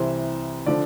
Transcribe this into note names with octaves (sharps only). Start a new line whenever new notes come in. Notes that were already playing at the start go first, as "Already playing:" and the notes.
Already playing: C2 C3 E3 C5
D3 F3 D5